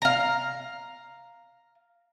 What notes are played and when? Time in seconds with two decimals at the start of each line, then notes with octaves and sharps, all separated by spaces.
0.02 F5 A#5